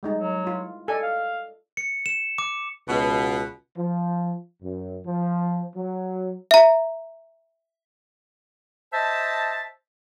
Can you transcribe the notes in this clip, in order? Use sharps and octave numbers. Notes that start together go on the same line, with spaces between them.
G3 G#3 D#4
F#3
E4 F4
A4 D5 D#5 G#5
F5
C#7
E7
D6
C#2 B2
F3
F#2
F3
F#3
E5 A#5
C5 D#5 E5 A5